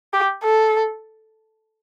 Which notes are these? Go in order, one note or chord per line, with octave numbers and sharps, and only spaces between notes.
G4
A4